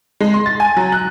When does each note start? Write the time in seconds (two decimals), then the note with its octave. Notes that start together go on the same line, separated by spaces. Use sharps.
0.20 G#3
0.34 C6
0.46 A6
0.60 G#5
0.77 F#3
0.92 F#6